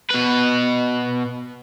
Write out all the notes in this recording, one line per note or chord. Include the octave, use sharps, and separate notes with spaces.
B2 B4